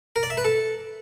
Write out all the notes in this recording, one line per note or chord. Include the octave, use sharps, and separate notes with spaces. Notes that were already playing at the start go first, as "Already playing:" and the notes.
A#4
D5
E5
B4
A4